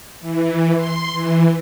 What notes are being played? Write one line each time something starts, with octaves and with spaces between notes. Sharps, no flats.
E3
C6
E3